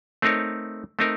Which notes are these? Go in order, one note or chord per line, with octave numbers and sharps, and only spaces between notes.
A3 C4 D#4 A#4 C#5
A3 C4 D#4 A#4